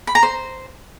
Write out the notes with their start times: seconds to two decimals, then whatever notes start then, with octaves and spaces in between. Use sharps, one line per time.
0.07 B5
0.15 A#5
0.23 C5